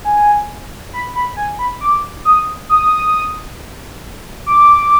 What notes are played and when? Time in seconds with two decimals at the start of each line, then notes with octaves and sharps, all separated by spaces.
0.05 G#5
0.93 B5
1.15 B5
1.37 G#5
1.59 B5
1.81 D6
2.25 D#6
2.69 D#6
4.46 D6